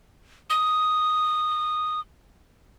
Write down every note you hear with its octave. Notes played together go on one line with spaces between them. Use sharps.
D#6